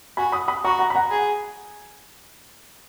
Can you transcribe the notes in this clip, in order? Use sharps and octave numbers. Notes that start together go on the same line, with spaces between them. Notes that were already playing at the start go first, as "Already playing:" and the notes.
F#4 G#5 B5
B5 D#6
B5 D#6
F#4 A#5 C#6
F#5 A#5
B5
F#5 A#5
G#4